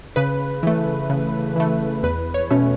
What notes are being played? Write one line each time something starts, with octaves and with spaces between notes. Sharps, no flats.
C#3 B4
E3 A3
C#3
E3 A3
E2 B4
C#5
B2 A3 C#4